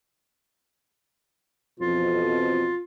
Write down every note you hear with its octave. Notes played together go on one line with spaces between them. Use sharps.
F2 B2 E3 F4